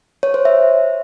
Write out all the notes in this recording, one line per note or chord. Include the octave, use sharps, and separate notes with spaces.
C#5
C5
E5